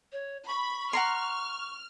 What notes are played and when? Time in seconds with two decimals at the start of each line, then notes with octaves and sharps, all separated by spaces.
0.12 C#5
0.47 B5 C#6
0.93 F#5 A#5 C6 F6